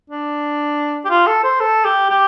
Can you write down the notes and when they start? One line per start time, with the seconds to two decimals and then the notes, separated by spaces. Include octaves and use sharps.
0.10 D4
1.05 G4
1.10 F4
1.27 A4
1.43 C5
1.60 A4
1.85 G4
2.10 G4